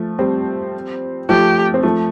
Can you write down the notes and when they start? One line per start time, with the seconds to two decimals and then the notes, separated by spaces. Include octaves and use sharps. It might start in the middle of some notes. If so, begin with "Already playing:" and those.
Already playing: F3 A3
0.19 G3 C4
1.28 F3 A3 G4
1.74 C4
1.83 F3 A3